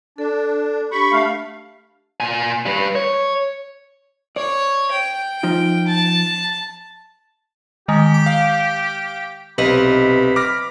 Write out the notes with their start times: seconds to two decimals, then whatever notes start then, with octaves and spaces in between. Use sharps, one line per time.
0.18 D4 A4
0.41 A4
0.92 D4 G4 B5 C#6
1.12 A3 F5
2.20 A#2 G#5
2.66 G3 B4
2.95 C#5
4.36 C#5 D5
4.91 G5
5.43 F3 D#4 F4
5.87 A5
7.88 D#3 G#3 G4
8.14 D6
8.26 F5
9.58 B1 C3 B4 D#5 B5
10.36 D6 F6 A#6